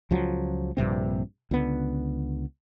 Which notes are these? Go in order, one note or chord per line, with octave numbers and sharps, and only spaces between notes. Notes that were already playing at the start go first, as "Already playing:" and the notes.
C#2 F3 F#3
A#1 G2 C3 C4
C#2 D3 B3